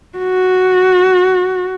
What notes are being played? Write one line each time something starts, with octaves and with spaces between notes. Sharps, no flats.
F#4